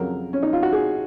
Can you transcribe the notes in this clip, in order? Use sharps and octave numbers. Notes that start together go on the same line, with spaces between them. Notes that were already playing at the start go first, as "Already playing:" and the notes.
Already playing: F2 C#3 F#3 A#4
C#4
D#4
F4
F#4
G#4